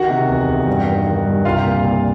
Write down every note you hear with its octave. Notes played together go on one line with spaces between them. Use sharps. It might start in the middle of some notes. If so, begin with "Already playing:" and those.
Already playing: D#3 F#4 F#5
C3
E2
E2
G2
D#3
D#3
G2
C2 F4 F5
A#2
A#2